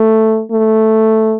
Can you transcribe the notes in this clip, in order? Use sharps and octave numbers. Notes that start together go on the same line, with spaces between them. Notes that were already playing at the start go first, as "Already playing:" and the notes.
Already playing: A3
A3